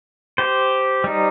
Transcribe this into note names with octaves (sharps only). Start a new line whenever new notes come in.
G4 C5
G3 D#4